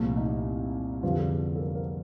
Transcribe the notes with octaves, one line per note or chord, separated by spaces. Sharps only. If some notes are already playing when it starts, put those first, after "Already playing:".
Already playing: C2 A#2 F3 A3
D#4
F2 D3 G3 B3 F4
G#4
A4
A4
A#4
A#4